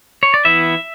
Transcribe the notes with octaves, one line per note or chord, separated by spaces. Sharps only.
C#5
D5
E3 B3 E4 E5